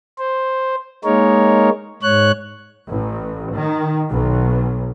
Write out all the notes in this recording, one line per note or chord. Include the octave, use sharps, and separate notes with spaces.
C5
G#3 A#3 D#4 A#4 C#5
G#2 C#5 F#6
A1
D#3
B1